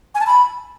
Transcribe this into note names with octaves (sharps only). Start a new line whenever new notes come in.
G#5
A5
B5